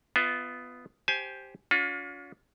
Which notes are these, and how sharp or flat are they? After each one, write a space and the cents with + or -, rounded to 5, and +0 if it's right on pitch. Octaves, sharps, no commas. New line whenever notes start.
B3 +10 F4 -10 E5 -40
G4 +0 C5 +0 G#5 +25
C#4 +45 F4 +40